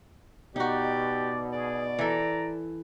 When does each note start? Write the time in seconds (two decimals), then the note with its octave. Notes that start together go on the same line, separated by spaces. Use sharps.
0.56 B2 D#4 F#4 G4 D5
1.53 G#4 D5
1.99 E3 A4 A#5